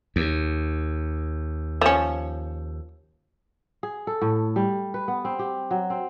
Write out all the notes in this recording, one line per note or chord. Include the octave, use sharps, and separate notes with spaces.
D#2
F3 C#4
G#4
A4
A2
G3
B4
B3
C4
G4
F#3
C4